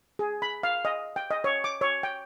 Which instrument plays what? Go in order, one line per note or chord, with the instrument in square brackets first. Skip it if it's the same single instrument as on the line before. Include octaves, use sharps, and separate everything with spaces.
[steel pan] G#4
B5
F5
D#5
G5
D#5
C#5
D6
C#5
G5